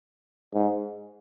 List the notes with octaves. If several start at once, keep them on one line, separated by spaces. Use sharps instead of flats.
G#2